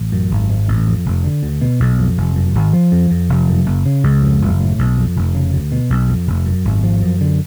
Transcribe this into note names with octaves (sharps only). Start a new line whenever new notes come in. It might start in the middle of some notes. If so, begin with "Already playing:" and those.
Already playing: A1
F#2
G#1
G#2
A1
F2
F1
D3
D2
B2
B1
F2
F1
F#2
G#1
F3
F2
F2
F1
F#2
F#1
C#3
C#2
F2
F#1
A2
B1
F2
F1
C#3
D2
B2
B1
F2
F1
F#2
G#1
F3
F#2
D3